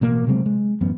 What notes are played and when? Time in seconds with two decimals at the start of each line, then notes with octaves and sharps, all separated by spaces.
0.01 A1 B2 A#3
0.27 C3 F#3 G#3 C4
0.46 G#3
0.81 A1 F#2 B3